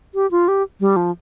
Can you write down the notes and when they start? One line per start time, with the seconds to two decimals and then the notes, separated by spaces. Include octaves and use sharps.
0.15 G4
0.31 F4
0.48 G4
0.80 G3
0.96 F3